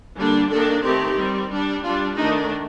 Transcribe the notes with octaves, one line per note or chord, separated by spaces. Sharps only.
D3 G3 A#3 D4
D#3 A#3 D4 A4
D#3 A3 C4 G4
G3 C4
G3 D4
G3 D4 F4
D#3 A3 D4 D#4